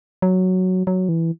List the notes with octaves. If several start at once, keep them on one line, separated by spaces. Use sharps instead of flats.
F#3
F#3
E3